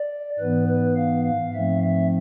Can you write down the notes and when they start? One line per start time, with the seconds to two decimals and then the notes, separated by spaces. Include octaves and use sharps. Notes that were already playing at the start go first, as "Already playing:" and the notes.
Already playing: D5
0.39 G#2 E3 B3 B4
0.68 B4
0.97 F5
1.25 F5
1.53 G#2 F3 A3 C4 E5
1.82 E5